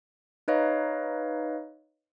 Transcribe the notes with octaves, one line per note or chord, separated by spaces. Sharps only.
D#4 B4 C#5 D#5 F5